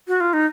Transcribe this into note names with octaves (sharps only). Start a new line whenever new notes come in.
F#4
F4
D#4